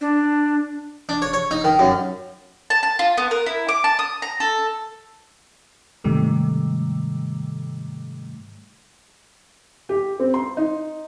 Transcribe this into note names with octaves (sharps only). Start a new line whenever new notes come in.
D4
D4
C#5
C#5
D#4
D#3
F#2
A5
A5
F4
B3
A#4
E4
D6
A5
D#6
A#5
A4
G#2 C3 D#3 G3 A3
G4
C4
C6
D#4